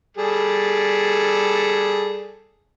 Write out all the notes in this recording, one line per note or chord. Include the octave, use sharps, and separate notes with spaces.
G3 G#4 A4